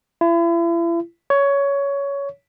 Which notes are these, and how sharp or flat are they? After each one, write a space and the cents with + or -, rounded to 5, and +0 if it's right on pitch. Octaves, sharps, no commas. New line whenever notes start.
E4 +40
C#5 +15